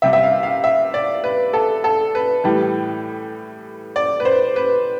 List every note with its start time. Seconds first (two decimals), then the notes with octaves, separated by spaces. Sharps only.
0.02 C3 G3 E5
0.13 E5
0.23 F5
0.43 F5
0.64 E5
0.94 D5
1.24 B4
1.53 A4
1.84 A4
2.15 B4
2.44 A2 E3 G3
3.96 D5
4.20 B4
4.25 C5
4.56 B4